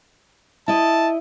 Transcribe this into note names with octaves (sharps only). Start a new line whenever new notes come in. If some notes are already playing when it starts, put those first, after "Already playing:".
E4 D#5 A5